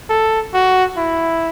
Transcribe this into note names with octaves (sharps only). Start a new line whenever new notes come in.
A4
F#4
E4